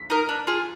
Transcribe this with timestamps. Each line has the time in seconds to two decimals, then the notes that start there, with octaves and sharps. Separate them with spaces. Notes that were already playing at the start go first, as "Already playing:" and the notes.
Already playing: B6
0.10 D#4 A#4
0.29 D4
0.47 F4 G#4